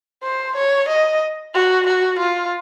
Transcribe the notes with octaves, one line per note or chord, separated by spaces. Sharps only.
C5
C#5
D#5
F#4
F#4
F4